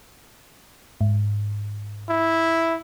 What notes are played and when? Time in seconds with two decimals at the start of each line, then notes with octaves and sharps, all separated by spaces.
1.01 G#2
2.09 E4